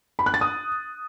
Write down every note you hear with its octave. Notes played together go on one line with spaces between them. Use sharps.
B5
F#6
A6
D#6